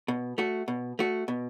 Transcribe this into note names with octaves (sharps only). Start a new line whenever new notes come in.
B2
A3 F#4
B2
A3 F#4
B2